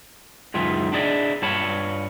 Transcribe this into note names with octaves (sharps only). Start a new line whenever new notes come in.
C#2 F#2 D#3 E4 F4
D4 E4 G#4 D5 D#5
G2 F4 C#5 A5 B5